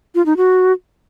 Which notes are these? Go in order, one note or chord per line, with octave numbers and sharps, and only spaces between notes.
F4
D#4
F#4